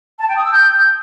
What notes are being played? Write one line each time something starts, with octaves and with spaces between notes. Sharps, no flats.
A5
G5
D#6
E6
G6